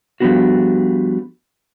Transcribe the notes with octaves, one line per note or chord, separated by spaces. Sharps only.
F3 G3 A3 B3 D4 F#4